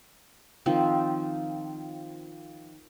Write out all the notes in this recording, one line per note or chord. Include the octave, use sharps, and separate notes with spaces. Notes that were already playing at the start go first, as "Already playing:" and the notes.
D#3 F3 C4